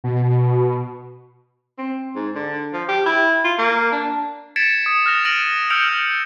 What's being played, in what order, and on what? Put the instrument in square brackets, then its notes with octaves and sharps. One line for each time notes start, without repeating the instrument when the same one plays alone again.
[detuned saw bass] B2
[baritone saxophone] C4
G#2
D3
F3
G4
E4
F4
A#3
D4
[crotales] G#6 A6 B6 C#7 D7 E7
D#6
F6 F#6 A#6 F7
F6 A#6 D7 D#7 F#7
E6 F6 G6 C#7 D7 F7
F6